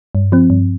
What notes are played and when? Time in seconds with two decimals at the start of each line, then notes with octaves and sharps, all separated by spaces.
0.15 G2
0.32 F3 C4
0.50 G2